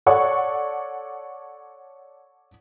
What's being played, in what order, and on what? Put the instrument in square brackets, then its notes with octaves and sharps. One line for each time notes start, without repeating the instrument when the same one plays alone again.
[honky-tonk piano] A4 C#5 D5 F#5 C#6